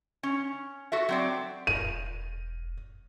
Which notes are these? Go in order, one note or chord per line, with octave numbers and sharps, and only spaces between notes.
C#4
F#4 A4 E5
F#3 C4 D5
E1 D#7